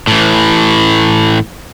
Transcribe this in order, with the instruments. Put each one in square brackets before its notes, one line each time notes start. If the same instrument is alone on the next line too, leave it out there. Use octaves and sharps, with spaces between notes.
[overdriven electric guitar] A2 E3